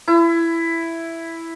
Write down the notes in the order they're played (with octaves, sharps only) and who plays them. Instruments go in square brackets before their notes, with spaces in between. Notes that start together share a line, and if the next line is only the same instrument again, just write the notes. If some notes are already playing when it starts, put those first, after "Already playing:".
[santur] E4